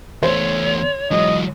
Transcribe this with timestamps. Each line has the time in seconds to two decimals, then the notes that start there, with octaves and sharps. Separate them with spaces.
0.23 E2 A3 C5 C#5
1.11 G#2 E3 F#3 D#5